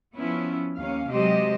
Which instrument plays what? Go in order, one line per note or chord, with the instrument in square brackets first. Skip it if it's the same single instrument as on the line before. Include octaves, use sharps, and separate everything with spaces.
[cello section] F3 B3 C#4 E4
D#2 C#4 F5
C3 F#3 G#3 G4 C5 D#5